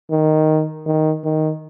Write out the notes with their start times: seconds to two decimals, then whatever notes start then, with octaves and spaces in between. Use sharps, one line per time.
0.11 D#3
0.86 D#3
1.25 D#3